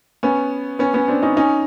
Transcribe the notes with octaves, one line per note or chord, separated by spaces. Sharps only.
B3 C#4
B3 C#4
B3 C#4
C4 D4
C#4 D#4
C#4 D#4